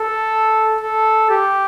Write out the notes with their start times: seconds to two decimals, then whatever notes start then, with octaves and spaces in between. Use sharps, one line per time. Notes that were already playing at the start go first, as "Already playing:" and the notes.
Already playing: A4
0.81 A4
1.30 G4